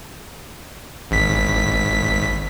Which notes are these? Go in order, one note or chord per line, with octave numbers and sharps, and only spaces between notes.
G#1 B6